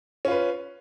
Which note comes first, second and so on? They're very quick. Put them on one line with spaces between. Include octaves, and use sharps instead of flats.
C#4 F4 B4